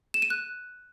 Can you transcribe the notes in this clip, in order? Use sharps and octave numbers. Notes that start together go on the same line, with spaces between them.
E7
D#7
F#6